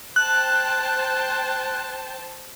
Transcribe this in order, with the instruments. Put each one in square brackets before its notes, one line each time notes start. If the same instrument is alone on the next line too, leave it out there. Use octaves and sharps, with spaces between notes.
[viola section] C5 G5 A5 [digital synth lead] F#6